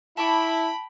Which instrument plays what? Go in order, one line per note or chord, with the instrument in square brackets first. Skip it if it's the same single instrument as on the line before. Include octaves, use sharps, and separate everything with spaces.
[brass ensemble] E4 [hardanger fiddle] G5 B5 [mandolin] A5 C#6 D6